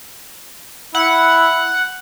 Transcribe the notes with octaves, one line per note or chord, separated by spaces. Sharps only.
E4 F#5